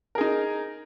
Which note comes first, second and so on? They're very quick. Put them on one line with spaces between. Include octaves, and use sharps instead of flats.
A#4 G#4 D#4